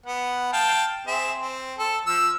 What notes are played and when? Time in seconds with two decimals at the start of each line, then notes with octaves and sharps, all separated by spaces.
0.06 B3 F#5
0.53 F5 G5 A5
1.07 C4 G#4 E5
1.39 C4
1.78 A4
2.06 F3 E6